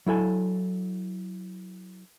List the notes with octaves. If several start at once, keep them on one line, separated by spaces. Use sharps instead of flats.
F#3 E4 A4 G#5